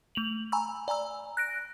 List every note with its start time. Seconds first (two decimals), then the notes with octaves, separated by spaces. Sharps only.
0.15 A3 F7 F#7
0.52 G#5 A#5 B5 C#6 E6
0.88 D5 G#5 A#5 E6
1.37 F#6 A#6 D7